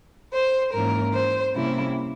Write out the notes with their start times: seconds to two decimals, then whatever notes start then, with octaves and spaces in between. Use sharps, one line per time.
0.34 C5
0.73 G#2 E3 A#3 C#4 A#4
1.14 C5
1.54 C3 G3 A#3 C#4 E4